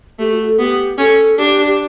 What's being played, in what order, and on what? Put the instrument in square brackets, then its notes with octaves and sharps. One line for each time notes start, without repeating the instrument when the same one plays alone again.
[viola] A3 [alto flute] G4
[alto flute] F#4
A4
[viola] B3 [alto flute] G4
[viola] C#4 [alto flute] A4
[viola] D4 [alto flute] G4
[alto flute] G4